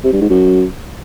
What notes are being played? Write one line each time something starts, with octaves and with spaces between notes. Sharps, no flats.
C3
G2
G#2
F#2